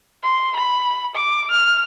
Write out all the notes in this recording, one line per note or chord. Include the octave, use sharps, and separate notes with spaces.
C6
B5
D6
F6